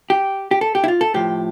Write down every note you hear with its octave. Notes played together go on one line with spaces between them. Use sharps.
G4
G4
A4
G4
E4
F4
A4
A2 F3 G4